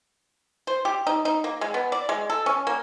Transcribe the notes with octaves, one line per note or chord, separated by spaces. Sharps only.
C5
G4
D#4
D#4
A#3
G#3
B3
D5
G#3
A4
C#4
A#3